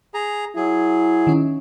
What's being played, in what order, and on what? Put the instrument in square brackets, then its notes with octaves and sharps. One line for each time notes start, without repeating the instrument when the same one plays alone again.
[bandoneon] G#4 A#5
[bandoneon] F#3 G#4 [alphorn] E4
[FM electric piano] D#3 C#4